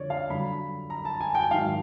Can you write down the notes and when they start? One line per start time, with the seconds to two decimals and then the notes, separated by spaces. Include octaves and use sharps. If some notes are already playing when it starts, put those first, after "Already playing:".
Already playing: F2 D3 C#5 D5
0.10 F5
0.30 G2 D3 F#3 B5
0.90 A#5
1.05 A5
1.21 G#5
1.35 G5
1.51 G#2 D#3 F#3 F5